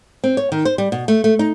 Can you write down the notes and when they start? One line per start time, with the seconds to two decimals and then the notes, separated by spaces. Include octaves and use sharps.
0.24 C4
0.37 C#5
0.52 D#3
0.65 C5
0.78 G3
0.92 B2
1.08 A3
1.24 A3
1.39 D#4